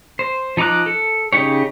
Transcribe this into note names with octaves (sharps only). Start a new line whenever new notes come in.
C5
F3 D#4 A#5 D6 F#6
A4
C#3 F3 D#4 G4 C#5